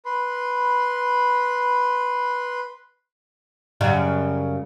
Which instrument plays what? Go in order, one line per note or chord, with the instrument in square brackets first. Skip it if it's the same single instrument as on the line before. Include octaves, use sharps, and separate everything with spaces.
[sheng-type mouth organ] B4 B5 C6
[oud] F#2 C#3 G3